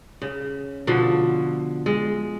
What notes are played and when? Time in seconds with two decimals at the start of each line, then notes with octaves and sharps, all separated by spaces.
0.22 C#3
0.87 B2 D3 F3
1.86 G#3